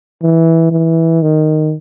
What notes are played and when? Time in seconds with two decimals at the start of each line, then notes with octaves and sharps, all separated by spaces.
0.22 E3
0.71 E3
1.22 D#3